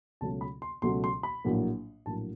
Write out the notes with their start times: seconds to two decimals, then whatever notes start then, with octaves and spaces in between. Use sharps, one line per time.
0.21 C#2 B2 F#3 A3 C#4 A5
0.41 B5
0.62 C6
0.82 C#2 B2 F#3 A3 C#4 C6
1.04 C6
1.23 B5
1.44 A#1 A2 F#3 A#3
2.06 A#1 A2 F#3 A#3 A5